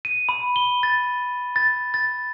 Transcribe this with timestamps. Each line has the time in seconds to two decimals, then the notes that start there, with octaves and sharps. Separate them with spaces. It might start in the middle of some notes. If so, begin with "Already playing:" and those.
0.05 D#7
0.29 B5
0.56 G7
0.83 A6
1.56 A6
1.94 A6